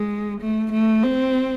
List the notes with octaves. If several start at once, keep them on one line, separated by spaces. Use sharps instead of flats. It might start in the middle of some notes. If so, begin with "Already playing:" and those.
Already playing: G#3
A3
A3
C4